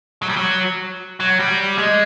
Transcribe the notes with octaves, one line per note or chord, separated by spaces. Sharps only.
F#3
G3
F#3
F#3
G3
G#3